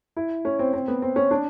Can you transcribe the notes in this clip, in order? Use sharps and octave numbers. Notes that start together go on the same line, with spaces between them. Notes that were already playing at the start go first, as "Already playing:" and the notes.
E4
C#4
C4
C4
B3
C4
C#4
D4